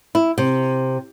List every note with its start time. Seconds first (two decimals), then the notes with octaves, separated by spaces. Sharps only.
0.15 E4
0.38 C3